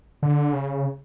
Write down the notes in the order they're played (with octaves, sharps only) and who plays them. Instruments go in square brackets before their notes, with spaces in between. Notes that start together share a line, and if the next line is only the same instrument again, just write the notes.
[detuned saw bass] D3
C#3